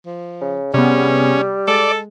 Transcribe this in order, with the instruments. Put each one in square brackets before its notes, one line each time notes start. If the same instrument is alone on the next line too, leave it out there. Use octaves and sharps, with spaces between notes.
[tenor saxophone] F3
[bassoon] C#3
[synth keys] C3 B3 [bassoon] G3 [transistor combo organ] C#4 [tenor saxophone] G#4
[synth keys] G#3 [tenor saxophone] A4 [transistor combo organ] D5